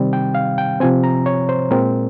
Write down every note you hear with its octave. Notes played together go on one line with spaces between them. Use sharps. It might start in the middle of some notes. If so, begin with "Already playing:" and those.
Already playing: C3 D#3 G3 C4
G5
F5
G5
C3 F3 C4 G#5
A#5
C#5
C5
A#2 G#3 C4 A#4